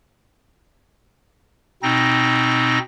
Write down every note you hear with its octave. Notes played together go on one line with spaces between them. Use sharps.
B2 C4 D#4 A#6